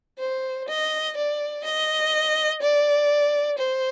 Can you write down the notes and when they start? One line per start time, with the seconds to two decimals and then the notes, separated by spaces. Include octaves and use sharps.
0.19 C5
0.68 D#5
1.17 D5
1.64 D#5
2.62 D5
3.58 C5